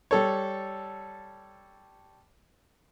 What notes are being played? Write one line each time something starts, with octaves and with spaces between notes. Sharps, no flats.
G3 A4 C#5